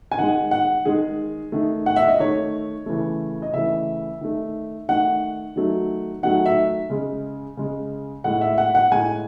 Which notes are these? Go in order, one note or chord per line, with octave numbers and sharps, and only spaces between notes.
G#5
D#3 G#3 F#5
F#5
D#3 G#3 G#4
D#3 A3
F#5
E5
D#5
D#3 A3 C#5
C#3 E3 A3
D#5
C#3 E3 A3 E5
D#3 A3
D#3 A3 F#5
D#3 F#3 A3
D#3 F#3 A3 F#5
E5
C#3 G#3
C#3 G#3
A2 G#3 F#5
E5
F#5
F#5
A2 G#3 G#5